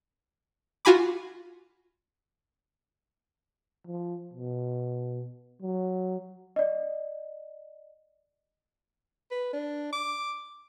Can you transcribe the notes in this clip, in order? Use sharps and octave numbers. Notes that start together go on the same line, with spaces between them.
F4 F#4 G#5 B5 D6
F3
B2
F#3
D5 D#5
B4
D4
D6